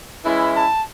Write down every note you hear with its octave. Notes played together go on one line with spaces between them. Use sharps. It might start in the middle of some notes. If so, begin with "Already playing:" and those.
E3 G#3 C#4 E4
A5